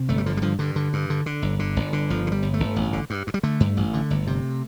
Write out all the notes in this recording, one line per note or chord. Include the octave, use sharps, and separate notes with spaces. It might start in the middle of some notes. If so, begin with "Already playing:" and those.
Already playing: C3
G1 A3
G3
D3 F3
G3
G2 F3
G2 D3
D3
G2
D3
D3
G1
D3
G1
D3
G1 F3
D3
G3
G1
A3
G1
A1
D3
G2
G2
G3
D3 A3
G2
A1
D3
G1
C3